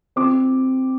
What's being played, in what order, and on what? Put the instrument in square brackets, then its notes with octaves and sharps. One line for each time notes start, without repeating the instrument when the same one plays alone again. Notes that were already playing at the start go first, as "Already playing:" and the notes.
[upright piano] C4 D6